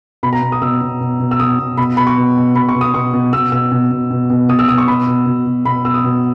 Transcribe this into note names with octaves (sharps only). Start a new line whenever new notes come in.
B2 B5
A#5
B2
D#6
B2 E6
B2
B2
B2
E6
B2 D#6
B2
B2 B5
B2 B5
C#6
B2
B2
B2 B5
C#6
B2
D#6
B2 C#6
B2
B2 E6
B2 E6
B2
B2
B2
B2
B2 D#6
E6
B2 D#6
C#6
B2 B5
B2
B2
B2
B2 B5
B2 E6
D#6
B2